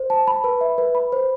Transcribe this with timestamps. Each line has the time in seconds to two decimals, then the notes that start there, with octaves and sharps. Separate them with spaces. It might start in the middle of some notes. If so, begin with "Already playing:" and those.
Already playing: C5
0.10 A5
0.27 B5
0.44 B4
0.61 E5
0.78 B4
0.95 B5
1.12 C5